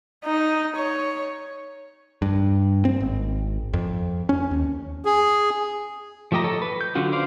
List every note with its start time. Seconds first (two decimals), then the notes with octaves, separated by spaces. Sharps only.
0.25 D#4
0.76 C#5
2.22 G2
2.85 C4
3.00 G#1
3.73 F2
4.29 C#4
4.51 D#2
5.05 G#4
6.32 F3 A3 G4 D#5 A#5
6.44 A4 C#5 D#5
6.62 B4
6.81 G6
6.95 D3 F#3 C#4 F4 F#4
7.12 B4 C5 D5 F5